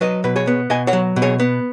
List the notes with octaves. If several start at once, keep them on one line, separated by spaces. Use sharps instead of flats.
F#3 B4 D#5
B2 B4
G#4 C#5
B3
B2 D#5 G#5
C#5 F#5
F#3
B2
G#4 C#5
B3